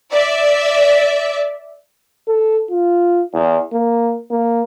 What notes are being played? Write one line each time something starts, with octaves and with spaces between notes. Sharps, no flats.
D5 E5
A4
F4
E2
A#3
A#3